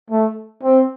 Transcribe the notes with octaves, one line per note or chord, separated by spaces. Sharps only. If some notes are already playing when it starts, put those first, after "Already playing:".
A3
C4